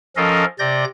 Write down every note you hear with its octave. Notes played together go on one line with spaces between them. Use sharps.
F3 C#4 A4 A#4 D#5 F5
C3 D5 G6 A#6